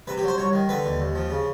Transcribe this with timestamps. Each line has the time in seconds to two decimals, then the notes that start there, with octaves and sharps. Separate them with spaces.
0.07 C3 B4
0.18 G4
0.23 F#3
0.28 C5
0.38 C2 C#5
0.53 D#3
0.69 D3 B4
0.85 D#2
1.00 D#2
1.15 F3
1.30 C#3